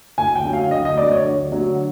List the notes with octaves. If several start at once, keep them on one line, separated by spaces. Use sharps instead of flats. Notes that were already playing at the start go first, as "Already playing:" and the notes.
D2 G#5
G5
D3 F#3
F5
D2 D#5
D#5
D3 F#3 D5
C#5
D2
D3 F#3